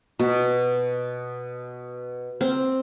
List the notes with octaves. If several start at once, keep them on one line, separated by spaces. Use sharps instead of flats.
B2
C4